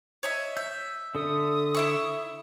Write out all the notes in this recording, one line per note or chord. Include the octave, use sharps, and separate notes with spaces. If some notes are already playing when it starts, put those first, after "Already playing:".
C#5 D#5 E5
E5 G6
D3 A4 D#6
E4 E5 C#6